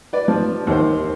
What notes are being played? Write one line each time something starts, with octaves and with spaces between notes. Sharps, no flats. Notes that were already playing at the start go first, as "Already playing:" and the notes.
B4 D5
F3
D#2 C5